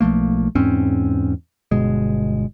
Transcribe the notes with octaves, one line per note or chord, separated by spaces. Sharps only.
B1 F3 A3 A#3
E2 G#2 C4 C#4
G1 B2 G#3